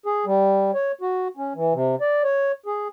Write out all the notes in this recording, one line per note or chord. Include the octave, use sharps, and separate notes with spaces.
G#4
G3
C#5
F#4
C#4
E3
C3
D5
C#5
G#4